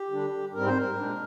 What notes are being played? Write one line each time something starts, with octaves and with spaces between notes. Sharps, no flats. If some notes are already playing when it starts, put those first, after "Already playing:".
Already playing: G4
D3 G3 D4
G#2 G3 C4 A#4
C5
A#4
A#2 G#3 D4